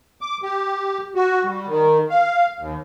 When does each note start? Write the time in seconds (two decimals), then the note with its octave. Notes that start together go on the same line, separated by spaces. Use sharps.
0.21 D6
0.43 G4
1.15 F#4
1.44 G3
1.67 D#3
2.10 F5
2.59 D#2